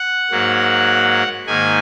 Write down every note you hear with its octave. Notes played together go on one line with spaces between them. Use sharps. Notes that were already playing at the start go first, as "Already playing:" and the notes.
Already playing: F#5
G#2 F#3 A#3
G#2 D#3 A#3 G#5